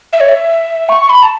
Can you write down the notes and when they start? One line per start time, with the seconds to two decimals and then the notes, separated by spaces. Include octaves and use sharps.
0.13 E5
0.20 C#5
0.29 E5
0.89 C#6
1.09 B5
1.23 A5